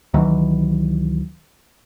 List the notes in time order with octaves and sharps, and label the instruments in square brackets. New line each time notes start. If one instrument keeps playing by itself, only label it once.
[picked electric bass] C#2 D#3 E3 F#3